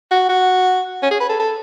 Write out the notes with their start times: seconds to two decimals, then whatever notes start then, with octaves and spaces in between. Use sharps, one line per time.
0.11 F#4
0.29 F#4
1.02 C#4
1.11 G#4
1.20 B4
1.29 A4
1.40 A4